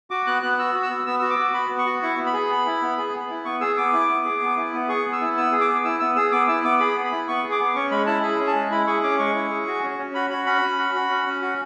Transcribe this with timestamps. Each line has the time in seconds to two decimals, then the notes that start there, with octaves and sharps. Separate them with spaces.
0.11 F#4 D6
0.26 B3 F#6
0.42 B3 F#6
0.59 F#4 E6
0.74 F#4
0.83 E6
0.90 B3
1.06 B3 E6
1.20 F#4 E6
1.30 D6
1.38 F#4
1.54 B3 B5
1.70 B3
1.78 C#6
1.86 F#4
2.02 E4 C#6
2.17 B3
2.26 B5
2.33 G#4
2.50 B3
2.66 E4
2.82 B3
2.98 G#4
3.13 B3
3.30 E4
3.45 B3 C#6
3.61 G#4 E6
3.77 B3 D6
3.93 E4
4.09 B3
4.25 G#4
4.41 B3
4.56 E4
4.73 B3
4.88 G#4 C#6
5.05 B3
5.12 E6
5.21 E4
5.37 B3 E6
5.52 G#4
5.61 D6
5.68 B3
5.84 E4 E6
6.00 B3 E6
6.16 G#4 E6
6.32 B3 D6
6.48 E4 E6
6.64 B3 D6
6.80 G#4 B5
6.96 B3
7.04 B5
7.12 E4
7.28 B3 C#6
7.44 G#4
7.52 D6
7.60 B3
7.75 C#4 C#6
7.91 G#3 B5
8.07 E4 A5
8.23 G#4 B5
8.39 C#4
8.47 A5
8.55 G#3
8.71 E4 B5
8.87 G#4 C#6
9.03 C#4 D6
9.19 G#3 C#6
9.35 E4
9.51 G#4
9.67 F#4
9.83 C#4
9.98 C#4
10.15 F#4 B5
10.30 F#4 B5
10.46 C#4 B5
10.62 C#4
10.78 F#4
10.94 F#4
11.10 C#4
11.26 C#4
11.42 F#4